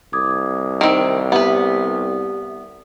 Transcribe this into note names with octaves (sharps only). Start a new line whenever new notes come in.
C2 D6 D#6 G#6
D#3 C4
B3 G4 B4 D5 E5